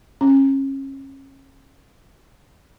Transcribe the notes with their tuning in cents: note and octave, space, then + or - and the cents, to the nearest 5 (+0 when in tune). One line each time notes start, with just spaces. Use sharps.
C#4 -35